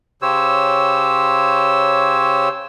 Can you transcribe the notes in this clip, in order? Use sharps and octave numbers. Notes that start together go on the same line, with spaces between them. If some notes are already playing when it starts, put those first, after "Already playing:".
C#3 G4 C5 C#5 E6